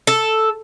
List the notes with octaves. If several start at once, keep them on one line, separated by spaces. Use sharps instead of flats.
A4